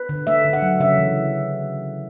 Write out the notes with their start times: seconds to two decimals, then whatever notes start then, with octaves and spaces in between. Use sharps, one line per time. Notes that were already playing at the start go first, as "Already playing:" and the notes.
Already playing: B4
0.09 D3
0.27 A3 E5
0.44 D3
0.53 F#5
0.62 F#3
0.80 C#3 E5
0.98 E3